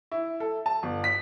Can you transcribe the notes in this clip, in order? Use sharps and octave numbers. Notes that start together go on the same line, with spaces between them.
E4
A4
A5
G1
B6